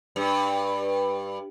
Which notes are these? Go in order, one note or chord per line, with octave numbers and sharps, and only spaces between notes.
G2